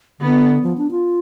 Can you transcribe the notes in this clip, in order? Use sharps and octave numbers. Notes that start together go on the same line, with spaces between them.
D3 B3
F3
D4
F4